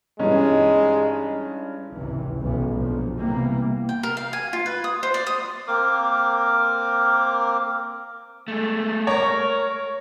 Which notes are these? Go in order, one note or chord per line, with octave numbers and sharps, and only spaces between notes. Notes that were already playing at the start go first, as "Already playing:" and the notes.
G2 E3 G#3 C#4 D#4
G#1 C#2 C3 E3
B1 F#2 A#2 E3 G#3 B3
A#2 D3 F3
C3 E3 G3 A#3 B3
G5
A#4
F5
G#5
F4
B4
D#6
C5
D5
D#6
A#3 C4 A#4 D6
G#3 A3
A#4 C#5